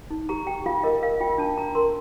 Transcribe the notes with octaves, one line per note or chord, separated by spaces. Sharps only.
D#4
G4 A#5
G4 G5
F4 F5
A#4 D#5
A#4 F5
F4 G5
D4 A5
F4 A#5
A#4 C6